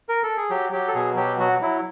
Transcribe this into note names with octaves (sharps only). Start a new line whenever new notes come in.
A#4
A4
G#4
F#3 G4
F#3 G4
A4
B2 G#4
F#3 G4
F#3 F#4
F#3 E4